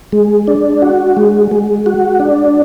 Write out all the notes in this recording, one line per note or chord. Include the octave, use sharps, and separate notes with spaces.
G#3
D4
F#4
G#3
G#3
F#4
D4